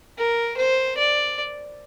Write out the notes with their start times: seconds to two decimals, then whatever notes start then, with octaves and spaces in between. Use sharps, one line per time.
0.18 A#4
0.57 C5
0.98 D5